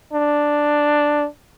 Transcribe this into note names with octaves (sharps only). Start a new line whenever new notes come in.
D4